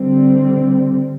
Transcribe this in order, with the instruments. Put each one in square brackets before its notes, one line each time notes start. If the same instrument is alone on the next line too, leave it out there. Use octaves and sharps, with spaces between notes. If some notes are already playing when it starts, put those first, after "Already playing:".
Already playing: [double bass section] D3 G3 C4